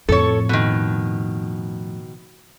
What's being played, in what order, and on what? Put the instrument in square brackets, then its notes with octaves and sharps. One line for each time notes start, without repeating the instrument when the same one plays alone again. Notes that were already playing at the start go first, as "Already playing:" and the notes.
[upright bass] F2 A2 [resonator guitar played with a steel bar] A4 C#5
[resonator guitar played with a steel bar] B2 D#3